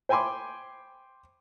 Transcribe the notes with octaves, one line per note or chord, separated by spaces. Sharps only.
C5 G5 G#5 B5 C6 D6